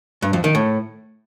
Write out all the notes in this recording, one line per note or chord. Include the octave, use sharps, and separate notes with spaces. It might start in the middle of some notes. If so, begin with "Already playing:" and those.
G2
F2
D#3
A2